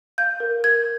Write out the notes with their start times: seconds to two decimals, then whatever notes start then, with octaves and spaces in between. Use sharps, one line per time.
0.18 F5 G6
0.40 A#4
0.64 A#4 G#6